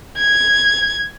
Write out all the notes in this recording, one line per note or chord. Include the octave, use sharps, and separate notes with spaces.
G#6